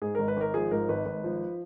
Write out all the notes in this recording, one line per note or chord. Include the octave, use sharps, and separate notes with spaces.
G#2 G#4
G#1 A#4
B4
G#1 A#4
F3 G#4
G#2 A#4
G#1 B4
G#1
F3